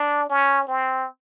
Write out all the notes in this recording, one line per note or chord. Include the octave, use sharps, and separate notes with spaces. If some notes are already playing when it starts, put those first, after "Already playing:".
Already playing: D4
C#4
C4